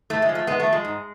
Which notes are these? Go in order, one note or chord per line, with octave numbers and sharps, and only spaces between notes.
A2 A3
G#3
F3
A3
G#2 G#3 B3
A3
F3
G#3
G#2